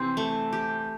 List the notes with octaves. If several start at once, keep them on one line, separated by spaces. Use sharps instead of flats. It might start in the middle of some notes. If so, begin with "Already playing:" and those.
Already playing: C3 E3 C4
A3
G4